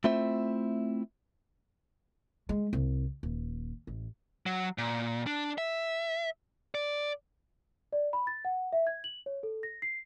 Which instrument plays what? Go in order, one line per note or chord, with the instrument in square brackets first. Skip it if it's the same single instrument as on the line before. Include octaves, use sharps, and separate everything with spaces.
[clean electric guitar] A3 C4 E4 F4 C5 E5
[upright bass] G#3
C2
D#1
A1
[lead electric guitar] F#3
A#2
D4
E5
D5
[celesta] D5
B5
A6
F#5
E5
G#6
F#7
C#5
A4
A#6
C7